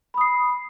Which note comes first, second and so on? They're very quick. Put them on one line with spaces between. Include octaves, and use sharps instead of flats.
B5 D#6 C7